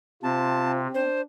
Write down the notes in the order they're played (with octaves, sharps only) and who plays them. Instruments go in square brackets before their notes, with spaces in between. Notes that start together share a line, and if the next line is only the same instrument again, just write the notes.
[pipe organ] C3 [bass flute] C4 [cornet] F4 [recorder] A5
[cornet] D4 [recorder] C5